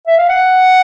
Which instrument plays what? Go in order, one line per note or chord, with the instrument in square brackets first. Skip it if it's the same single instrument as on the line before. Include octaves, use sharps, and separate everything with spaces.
[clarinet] E5
F5
F#5